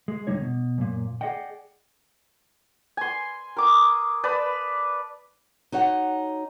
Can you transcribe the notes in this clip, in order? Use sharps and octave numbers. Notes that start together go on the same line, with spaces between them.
G#3
F2 D3 G3 D#4 C#5
B2
F#2 A#2
G#4 A4 D5 D#5 F#5 G5
G#5 C6
A#4 D6 D#6
B4 D5 A5
D#4 F#4 C#5 F#5